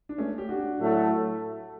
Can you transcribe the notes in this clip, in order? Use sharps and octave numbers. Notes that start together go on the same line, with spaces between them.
D4
A3 C#4
G4
D4 F#4
A2 F#3 A3